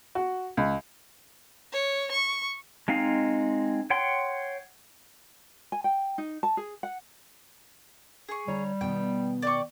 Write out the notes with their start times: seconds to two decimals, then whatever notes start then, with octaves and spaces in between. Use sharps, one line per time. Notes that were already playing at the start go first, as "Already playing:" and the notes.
0.15 F#4
0.57 C#2
1.73 C#5
2.11 C#6
2.88 G#3 C4 D#4 F5
3.90 C#5 F#5 G5 C6
5.72 G#5
5.84 G5
6.18 D#4
6.43 A5
6.57 G#4
6.83 F#5
8.29 G#4 C#6
8.47 D3 G3 C#5 A#5
8.81 B2 D#3 B3 G5
9.42 D5 G5 C#6